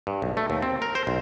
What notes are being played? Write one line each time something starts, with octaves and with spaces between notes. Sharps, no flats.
G2
B1
A3
D#2
C4
A#4
C5
B1